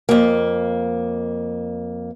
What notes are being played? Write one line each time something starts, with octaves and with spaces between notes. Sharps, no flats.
F2 A#3